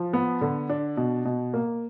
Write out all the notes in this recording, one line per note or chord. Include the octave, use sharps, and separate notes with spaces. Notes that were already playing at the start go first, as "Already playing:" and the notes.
Already playing: F3
B3
D3
D4
B2
B2
A#3